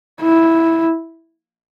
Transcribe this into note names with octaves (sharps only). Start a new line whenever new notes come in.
E4